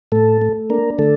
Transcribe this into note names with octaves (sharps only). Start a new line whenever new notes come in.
A2 A3 A4
A3
A#3 D4 A#4
D3 A3 A4